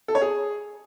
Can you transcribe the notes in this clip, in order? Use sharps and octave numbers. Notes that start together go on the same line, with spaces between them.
A4
C#5
G#4